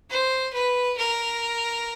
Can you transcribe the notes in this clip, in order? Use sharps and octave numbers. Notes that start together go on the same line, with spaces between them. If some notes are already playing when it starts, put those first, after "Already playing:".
C5
B4
A#4